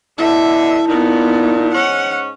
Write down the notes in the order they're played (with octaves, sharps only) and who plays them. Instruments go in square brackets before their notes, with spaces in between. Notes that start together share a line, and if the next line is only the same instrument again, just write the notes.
[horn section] B2 D3 [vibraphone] E4 A5 [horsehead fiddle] E5
[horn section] A#2 [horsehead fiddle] B3 D#4
[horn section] G#2 C#4 [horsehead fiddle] F#5